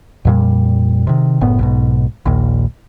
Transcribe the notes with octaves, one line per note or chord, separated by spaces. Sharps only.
F2 A#2 G3
C3 D#3
F#1 A2 B3
B1 G#2 B2
A#1 D#2 A#2